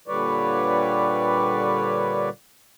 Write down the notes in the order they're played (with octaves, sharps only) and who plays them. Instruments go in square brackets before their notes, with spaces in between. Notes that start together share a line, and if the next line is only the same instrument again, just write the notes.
[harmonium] A#2 D3 G3 B4 C#5 D5